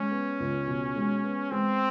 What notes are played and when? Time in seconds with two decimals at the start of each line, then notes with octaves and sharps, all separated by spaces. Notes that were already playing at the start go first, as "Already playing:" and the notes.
Already playing: G#3 C#4
0.11 B3
0.40 C#2
0.67 B2
0.96 G#3
1.24 B3
1.51 G#3 C4